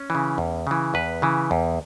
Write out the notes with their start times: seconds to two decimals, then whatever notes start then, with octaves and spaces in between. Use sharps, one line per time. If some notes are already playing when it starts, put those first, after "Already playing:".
Already playing: C#4
0.10 C#3 E3
0.38 E2
0.67 C#3 E3
0.94 E2 B4
1.22 C#3 E3
1.51 E2